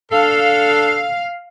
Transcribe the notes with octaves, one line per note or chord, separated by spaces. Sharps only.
D4 A4 F5